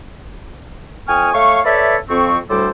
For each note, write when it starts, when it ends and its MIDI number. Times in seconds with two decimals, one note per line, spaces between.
1.09 1.31 41
1.09 1.31 79
1.09 1.31 80
1.09 1.31 85
1.09 1.31 87
1.09 1.31 89
1.33 1.60 57
1.33 1.60 73
1.33 1.60 77
1.33 1.60 85
1.65 1.97 69
1.65 1.97 71
1.65 1.97 73
1.65 1.97 74
1.65 1.97 76
2.09 2.38 41
2.09 2.38 60
2.09 2.38 85
2.50 2.68 38
2.50 2.68 45
2.50 2.68 55
2.50 2.68 69
2.50 2.68 72
2.50 2.68 86